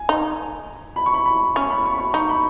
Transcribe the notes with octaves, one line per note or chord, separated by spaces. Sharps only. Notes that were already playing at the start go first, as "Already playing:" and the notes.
Already playing: G#5
D#4
B5
C#6
B5
B5
C#4 C#6
B5
C#6
B5
C#6
D#4 C#6
B5